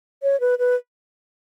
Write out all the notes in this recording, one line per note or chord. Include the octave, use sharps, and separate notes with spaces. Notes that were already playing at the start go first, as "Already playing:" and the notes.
C#5
B4
B4